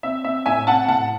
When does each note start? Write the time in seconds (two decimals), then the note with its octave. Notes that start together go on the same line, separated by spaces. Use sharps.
0.03 C4 E5
0.24 C4 E5
0.46 A2 E5 G#5
0.67 C4 F#5 A5
0.88 A2 F#5 A5